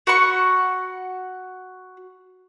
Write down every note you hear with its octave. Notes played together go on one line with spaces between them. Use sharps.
F#4 F#5 B5 C#6